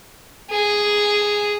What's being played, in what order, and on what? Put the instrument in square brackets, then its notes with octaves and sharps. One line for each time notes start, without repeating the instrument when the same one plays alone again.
[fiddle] G#4